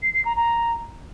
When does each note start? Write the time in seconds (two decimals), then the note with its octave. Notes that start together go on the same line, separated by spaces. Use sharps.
0.03 C7
0.14 C7
0.25 A#5
0.36 A#5